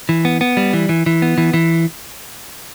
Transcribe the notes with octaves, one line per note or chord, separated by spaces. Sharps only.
E3
B3
B3
G3
E3
E3
E3
B3
E3
E3